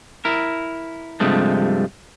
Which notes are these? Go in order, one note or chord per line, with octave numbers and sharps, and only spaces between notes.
E4 A#4
G2 C3 F3 G#3 A3